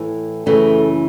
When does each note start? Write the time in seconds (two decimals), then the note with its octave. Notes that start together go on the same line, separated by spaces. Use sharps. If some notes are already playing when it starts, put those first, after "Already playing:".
Already playing: A2 E3
0.46 F#2 C#3 E3 A3